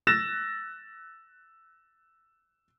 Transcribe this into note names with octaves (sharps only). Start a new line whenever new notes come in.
E6 F#6 A6 A#6 E7